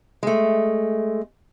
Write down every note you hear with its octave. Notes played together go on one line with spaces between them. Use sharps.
G#3 A3